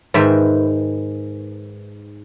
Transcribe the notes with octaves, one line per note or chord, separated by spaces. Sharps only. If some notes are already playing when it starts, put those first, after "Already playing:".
G#2 D#3 B4 E5 G5